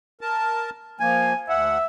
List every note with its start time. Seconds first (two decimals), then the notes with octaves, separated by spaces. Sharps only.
0.21 A#4 A5
1.00 F3 A#3 G#5
1.49 D2 E5 F#5